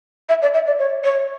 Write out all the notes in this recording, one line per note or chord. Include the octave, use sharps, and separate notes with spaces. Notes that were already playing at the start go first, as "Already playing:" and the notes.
E5
D5
E5
D5
C#5
C#5